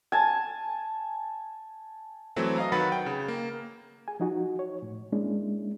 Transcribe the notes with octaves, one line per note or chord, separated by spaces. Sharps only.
G#5 A5
E3 F#3 A3 C4
D#5 F5 A#5
D#3 F#3 B4 F#5 B5 A6
G5
C#3
A#3
G#4 G#5
F3 D#4 F#4
C#5
A2
G#3 A#3 C#4 D4 E4